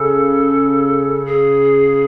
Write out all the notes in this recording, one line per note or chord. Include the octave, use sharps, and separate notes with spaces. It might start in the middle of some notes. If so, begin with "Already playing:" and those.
Already playing: C#3 A4
G#4